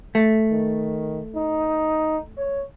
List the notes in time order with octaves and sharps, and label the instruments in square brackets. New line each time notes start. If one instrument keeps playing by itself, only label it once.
[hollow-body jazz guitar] A3
[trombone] D#3
D#4
C#5